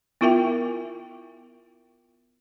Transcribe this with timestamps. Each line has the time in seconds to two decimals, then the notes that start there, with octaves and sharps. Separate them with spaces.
0.21 B3 E4 F4 A#4 E5 G5